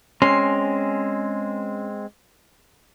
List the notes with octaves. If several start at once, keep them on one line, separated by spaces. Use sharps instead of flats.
G#3 C4 C#4 C6